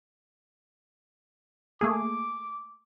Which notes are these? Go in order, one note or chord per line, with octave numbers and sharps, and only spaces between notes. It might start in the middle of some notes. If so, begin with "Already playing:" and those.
A3 A#3 G#4 D6